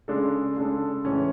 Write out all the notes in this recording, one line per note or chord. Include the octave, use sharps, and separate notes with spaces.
C#3 G#3 D4 A4
C#3 G#3 D4 A4
A2 E3 G#3 C#4